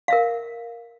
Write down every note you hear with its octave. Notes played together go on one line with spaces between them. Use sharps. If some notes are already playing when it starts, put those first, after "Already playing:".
A#4 E5 F5